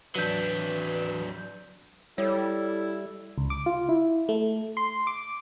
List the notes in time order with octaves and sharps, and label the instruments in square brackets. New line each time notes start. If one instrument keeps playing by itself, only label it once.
[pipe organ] E3 [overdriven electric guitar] F#3 D4 [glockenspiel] G6 B6 D#7
[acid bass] G3 [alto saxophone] E4 [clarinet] A4 [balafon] C#5
[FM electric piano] C#2
D6
F4
E4
A3
C6
D6